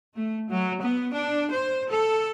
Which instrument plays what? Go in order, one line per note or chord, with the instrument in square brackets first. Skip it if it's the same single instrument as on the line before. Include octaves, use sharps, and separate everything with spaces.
[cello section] A3
F#3
B3
D4
C5
A4